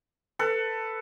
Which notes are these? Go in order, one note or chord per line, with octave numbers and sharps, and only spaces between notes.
A4 B4